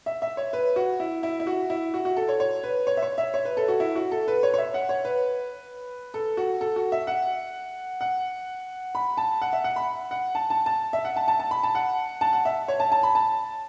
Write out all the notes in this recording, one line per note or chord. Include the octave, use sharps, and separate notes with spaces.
E5
E5
C#5
B4
F#4
E4
E4
E4
F#4
E4
F#4
F#4
A4
C#5
C#5
B4
C#5
E5
C#5
E5
C#5
B4
A4
F#4
E4
F#4
A4
B4
C#5
C#5
E5
F#5
C#5
B4
A4
F#4
A4
F#4
E5
F#5
F#5
B5
A5
F#5
E5
F#5
B5
F#5
A5
A5
A5
E5
F#5
A5
A5
A5
B5
A5
F#5
A5
F#5
E5
C#5
A5
A5
B5
A5